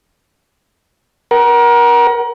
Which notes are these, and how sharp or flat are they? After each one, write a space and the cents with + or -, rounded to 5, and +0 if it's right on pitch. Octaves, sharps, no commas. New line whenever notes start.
A#4 +30 F#5 +35